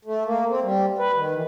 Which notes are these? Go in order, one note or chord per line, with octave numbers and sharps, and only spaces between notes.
A3
A#3
C4
G3
B4
D#3
E3